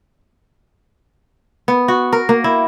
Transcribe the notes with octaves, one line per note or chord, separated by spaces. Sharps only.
B3
F#4
A#4
A#3
E4